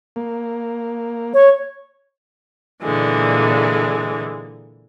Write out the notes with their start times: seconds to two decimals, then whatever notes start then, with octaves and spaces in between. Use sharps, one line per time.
0.16 A#3
1.34 C#5
2.82 A#2 D3 E3 G#3